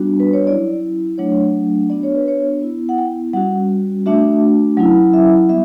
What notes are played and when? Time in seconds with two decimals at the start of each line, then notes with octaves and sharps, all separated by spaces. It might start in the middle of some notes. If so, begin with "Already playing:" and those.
Already playing: G3 B3 D4 F#4
0.20 B4
0.33 C#5
0.47 F#3 C#4 E4 D5
1.18 F#3 A3 D4 C#5
1.90 B3 D4 F#4 D5
2.03 C#5
2.16 B4
2.28 C#5
2.62 B3 E4
2.89 F#5
2.98 G5
3.33 G3 C#4 F#4 F#5
4.06 A3 D4 F#4 E5
4.77 F#3 C#4 E4
5.13 E5
5.49 G3 B3 E5